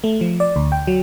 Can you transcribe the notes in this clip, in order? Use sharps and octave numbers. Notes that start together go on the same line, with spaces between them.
A3
F3
D5
D2
G5
F#3